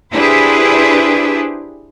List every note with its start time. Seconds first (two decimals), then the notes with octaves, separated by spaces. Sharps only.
0.12 D4 E4 G4 G#4 B4 C5